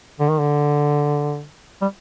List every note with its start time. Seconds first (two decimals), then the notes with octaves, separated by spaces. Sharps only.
0.20 D3
0.30 D#3
0.39 D3
1.82 G3